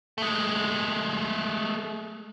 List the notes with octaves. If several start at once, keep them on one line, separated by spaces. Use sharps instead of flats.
G#3 A3